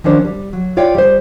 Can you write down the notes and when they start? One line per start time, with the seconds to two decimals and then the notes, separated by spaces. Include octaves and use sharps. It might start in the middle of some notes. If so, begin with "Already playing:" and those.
0.04 D#3 F3 C#4 D4 C5
0.25 G3
0.53 F#3
0.77 F4 C#5 D5 F5 G5
0.95 G3 C5